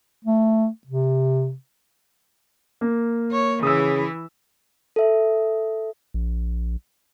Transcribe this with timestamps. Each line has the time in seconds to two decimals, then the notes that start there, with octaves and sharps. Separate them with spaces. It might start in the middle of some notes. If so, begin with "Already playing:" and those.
0.24 A3
0.87 C3
2.81 A#3
3.32 C#5
3.63 C#3 E3 E4 D#6 E6
4.96 A4 E5
6.14 A#1